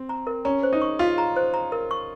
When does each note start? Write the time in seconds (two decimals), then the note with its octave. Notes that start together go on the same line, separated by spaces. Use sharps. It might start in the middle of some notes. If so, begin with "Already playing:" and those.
Already playing: C4
0.09 A#5
0.27 A#4
0.45 C#4 A#5
0.63 C5
0.73 D#4
0.82 C#6
0.99 F4 F5
1.18 A#5
1.36 C5
1.54 A#5
1.72 A#4
1.91 C#6